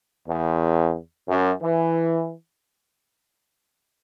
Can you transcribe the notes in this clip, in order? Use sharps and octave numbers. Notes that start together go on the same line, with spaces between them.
E2
F#2
E3